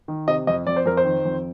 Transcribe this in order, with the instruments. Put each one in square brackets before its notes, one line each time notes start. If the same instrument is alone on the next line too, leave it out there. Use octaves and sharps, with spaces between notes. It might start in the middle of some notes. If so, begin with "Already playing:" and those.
[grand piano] D#3
C3 D#5
F2 D#5
F2 D5
C5
F2 A#4
C5
D#3
F2